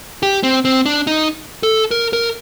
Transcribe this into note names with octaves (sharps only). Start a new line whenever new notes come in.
G4
C4
C4
D4
D#4
A4
A#4
A#4